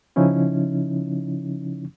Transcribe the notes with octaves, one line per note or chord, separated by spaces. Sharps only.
C#3 F3 C#4 D#4 E4